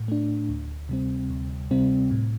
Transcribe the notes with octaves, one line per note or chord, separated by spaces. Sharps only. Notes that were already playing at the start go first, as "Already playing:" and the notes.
Already playing: A2
A3 D4
D2
C3 G3 C4
D2
C3 G3 C4
A2